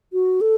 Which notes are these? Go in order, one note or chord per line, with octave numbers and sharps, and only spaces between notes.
F#4
A4